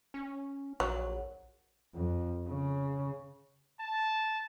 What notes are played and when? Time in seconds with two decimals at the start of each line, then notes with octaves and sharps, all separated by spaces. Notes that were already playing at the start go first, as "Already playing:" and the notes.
0.14 C#4
0.80 A#1 F#3
1.95 F2
2.48 C#3
3.80 A5